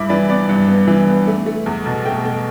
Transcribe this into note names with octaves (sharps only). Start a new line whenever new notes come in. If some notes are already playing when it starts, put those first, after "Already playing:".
Already playing: G2 E4 B5 D6
E3 D5
B3 D5
G2
B3
E3
B3
A3
A3
E2
B2
A3 G5
A3